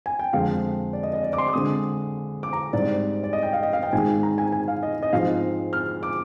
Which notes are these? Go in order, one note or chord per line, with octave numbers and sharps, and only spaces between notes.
G#5
G5
F2 D3 G#3 C4 F5
D5
D#5
D#5
D5
D6
C6
D6
D3 G#3 C4 D#6
D6
A#5
G#2 G3 C4 D5
D5
D#5
G5
F5
D#5
F5
G5
G#2 D#3 G#3 G#5
A#5
G#5
G#5
F5
D#5
D#5
G#2 F3 G#3 C4 F5
F6
D6